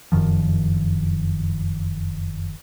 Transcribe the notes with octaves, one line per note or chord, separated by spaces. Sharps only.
F1 F#2 D#3 F3